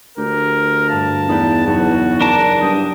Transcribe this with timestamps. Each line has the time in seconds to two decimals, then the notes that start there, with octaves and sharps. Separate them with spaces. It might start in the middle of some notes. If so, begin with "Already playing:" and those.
0.18 D2 G4 A#4
0.89 G2 F5 A5
1.29 E2 D#4 B4 G5
1.67 F#1 E2 F#4
2.21 D4 A#4 A5
2.62 G2 G5 D#6